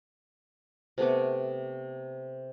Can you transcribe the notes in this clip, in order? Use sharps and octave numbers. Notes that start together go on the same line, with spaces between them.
C3 A3 B3 D6